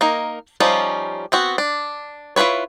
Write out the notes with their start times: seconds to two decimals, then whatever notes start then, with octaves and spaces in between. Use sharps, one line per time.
0.01 A#3 D#4 A#4
0.60 F3 G3 C#4 D#4 F4
1.32 B3 C4 F#4
1.58 D4
2.36 E4 F4 A#4 B4 C#5